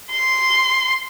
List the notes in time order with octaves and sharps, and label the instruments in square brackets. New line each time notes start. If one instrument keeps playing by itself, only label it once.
[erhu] C6